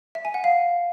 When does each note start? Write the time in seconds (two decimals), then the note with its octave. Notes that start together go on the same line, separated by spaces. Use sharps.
0.15 E5
0.25 G#5
0.34 F#5
0.44 F5